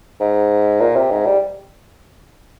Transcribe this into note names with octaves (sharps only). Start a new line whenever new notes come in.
G#2
A#2
C3
G#2
G3